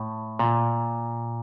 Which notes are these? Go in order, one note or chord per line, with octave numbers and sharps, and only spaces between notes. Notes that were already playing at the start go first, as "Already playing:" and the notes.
Already playing: A2
A#2